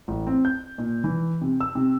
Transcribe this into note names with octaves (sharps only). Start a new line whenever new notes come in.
A1
C4
G6
A#2
E3
C3
E6
C3